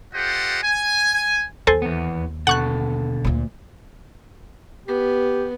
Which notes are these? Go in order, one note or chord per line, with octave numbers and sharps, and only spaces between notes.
F4 G4 A4 C5 D#5 F#5
G#5
D#2 A4 C5 G#5
E2 B3
B2 D3 A4 F#5 C#6 F#6
D2 A#2
B3 G4